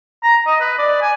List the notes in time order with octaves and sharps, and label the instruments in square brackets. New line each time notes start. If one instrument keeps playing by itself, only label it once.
[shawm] A#5
D#5
B4
D5
G#5